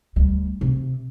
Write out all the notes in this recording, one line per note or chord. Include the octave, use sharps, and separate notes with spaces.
D2 G3
C3